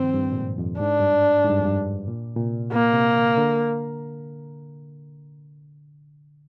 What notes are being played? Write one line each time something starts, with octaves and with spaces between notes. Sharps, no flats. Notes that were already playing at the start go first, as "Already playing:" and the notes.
Already playing: G2 D#3 F3 C4
G2
A#2
G#2
F2
G#2 D4
G2
G#2
G#2
G2
F2
G2
A#2
A#2
C3
A#2 A#3
C3
D3
D3